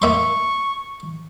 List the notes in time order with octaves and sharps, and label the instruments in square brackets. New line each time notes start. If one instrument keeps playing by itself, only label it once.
[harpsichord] A#3 E5 C6 [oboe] C#6